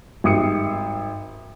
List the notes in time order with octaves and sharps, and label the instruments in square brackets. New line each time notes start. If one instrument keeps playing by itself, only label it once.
[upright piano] G#1 G3 E5 D#6 C7 C#7